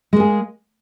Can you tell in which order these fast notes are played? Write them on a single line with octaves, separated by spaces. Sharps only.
G#3 A#3 G#4